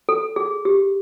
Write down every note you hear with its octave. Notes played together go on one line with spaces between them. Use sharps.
A4
G#4
G4